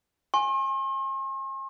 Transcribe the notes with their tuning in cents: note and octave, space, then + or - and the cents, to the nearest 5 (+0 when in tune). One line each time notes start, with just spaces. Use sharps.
G#5 +0 C6 +45